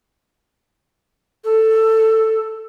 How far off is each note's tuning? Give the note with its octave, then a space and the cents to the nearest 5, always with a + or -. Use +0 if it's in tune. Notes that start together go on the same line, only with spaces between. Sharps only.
A4 +10